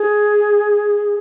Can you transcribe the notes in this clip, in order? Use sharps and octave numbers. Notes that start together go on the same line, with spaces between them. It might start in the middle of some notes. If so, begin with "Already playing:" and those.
Already playing: G#4